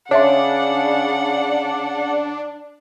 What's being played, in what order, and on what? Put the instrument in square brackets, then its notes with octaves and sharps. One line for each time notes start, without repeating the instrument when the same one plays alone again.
[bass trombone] C#3 [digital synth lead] D4 [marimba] C#5 E5 C6 [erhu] F#5